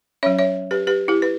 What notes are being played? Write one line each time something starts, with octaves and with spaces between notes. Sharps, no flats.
F#3 C#4 C#5 E5
C#5 E5
G4 B4
G4 B4
E4 G4
B4